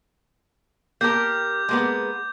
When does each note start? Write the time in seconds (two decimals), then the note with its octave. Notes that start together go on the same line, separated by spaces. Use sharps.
1.01 A#3 G4 A#4 D6 G6
1.69 G#3 A#3 B3